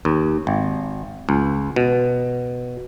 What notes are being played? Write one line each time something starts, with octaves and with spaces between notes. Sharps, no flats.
D#2
G#1
C#2
B2